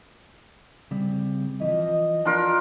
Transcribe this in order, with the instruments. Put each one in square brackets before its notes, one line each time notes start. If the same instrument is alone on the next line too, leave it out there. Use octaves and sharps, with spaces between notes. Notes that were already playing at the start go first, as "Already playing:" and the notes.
[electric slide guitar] C#3 G3 C4
[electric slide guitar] E3 F3 [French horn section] D#5
[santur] D4 F4 A#4